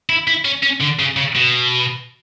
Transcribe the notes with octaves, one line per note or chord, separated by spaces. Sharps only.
E4
E4
C#4
C#4
D3
C#3
C#3
B2